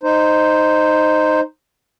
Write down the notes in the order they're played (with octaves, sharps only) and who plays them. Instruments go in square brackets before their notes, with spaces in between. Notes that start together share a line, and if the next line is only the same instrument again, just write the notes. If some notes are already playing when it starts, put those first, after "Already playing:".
[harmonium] D#4 C5